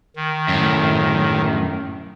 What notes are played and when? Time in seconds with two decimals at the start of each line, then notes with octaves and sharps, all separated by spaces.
0.16 D#3
0.48 F#2 A2